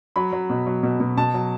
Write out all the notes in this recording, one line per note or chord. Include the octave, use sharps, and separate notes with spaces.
F#3 B5
F#3
B2
F#3
B2
B2
B2 A5
F#3